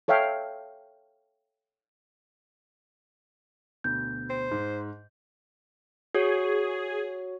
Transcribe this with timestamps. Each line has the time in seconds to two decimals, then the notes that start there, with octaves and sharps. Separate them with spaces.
0.08 A4 C#5 E5 F5 G5
3.84 D2 B2 G6
4.30 C5
4.51 G#2
6.15 F#4 G#4 C#5